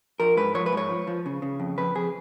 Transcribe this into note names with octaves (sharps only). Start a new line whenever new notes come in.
F3 A#4
G#2 B4
F3 C#5
B4
G#2 C#5
F3
F3
C#3
C#3
F2
F2 B4
F2 G#4